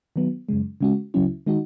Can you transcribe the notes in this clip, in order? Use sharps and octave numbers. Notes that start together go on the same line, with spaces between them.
D#3 F#3 B3
F#2 C#3 G#3
C#3 G#3 C#4 F#4
C#2 C#3 F#3 C#4 E4
D#3 G#3 D#4 F#4